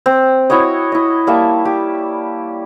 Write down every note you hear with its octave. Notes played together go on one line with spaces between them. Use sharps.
C4
E4 F#4 C#5 D#5
E4 D#5
G3 A#3 E5 A5
G4